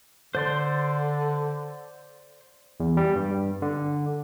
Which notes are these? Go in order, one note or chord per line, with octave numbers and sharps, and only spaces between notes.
D3 C5 D5 C6
E2
G3
G2
D3